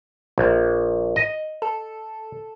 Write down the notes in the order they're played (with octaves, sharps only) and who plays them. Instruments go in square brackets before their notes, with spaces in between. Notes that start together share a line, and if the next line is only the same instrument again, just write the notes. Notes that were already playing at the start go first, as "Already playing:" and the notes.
[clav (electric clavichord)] A#1
D#5
[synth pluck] A4